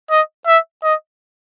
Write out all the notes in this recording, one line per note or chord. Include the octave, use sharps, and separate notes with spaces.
D#5
E5
D#5